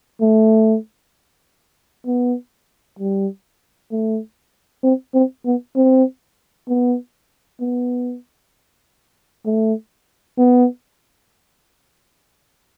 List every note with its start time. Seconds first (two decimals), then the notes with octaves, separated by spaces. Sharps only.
0.21 A3
2.06 B3
2.99 G3
3.91 A3
4.83 C4
5.14 C4
5.45 B3
5.76 C4
6.68 B3
7.61 B3
9.46 A3
10.38 B3